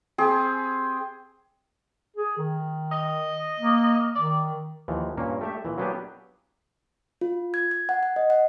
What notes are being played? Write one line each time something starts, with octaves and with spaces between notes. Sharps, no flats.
C4 G4 G#4
G#4
D#3
D#5
A#3
D#3 D5
D#2 E3 F3
G2 A#2 A#3 C#4
A3 G4 E5
A#2 E3
F#3 A#3 B3 D4 G4 G#4
F4
G#6
G#6
F#5
F#5
D#5
F#5